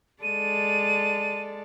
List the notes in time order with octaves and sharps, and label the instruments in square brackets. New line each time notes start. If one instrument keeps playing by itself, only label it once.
[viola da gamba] G#3 A4 D5 [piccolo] D#7